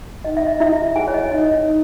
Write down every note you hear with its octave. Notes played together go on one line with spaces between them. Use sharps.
D#4 D#5
E5
D#5
E4 G4 E5
G#4 C#5 G#5
C#5
D#5
D#4 D#5
D#4